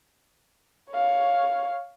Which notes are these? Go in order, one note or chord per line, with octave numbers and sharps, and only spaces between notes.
C#5 F5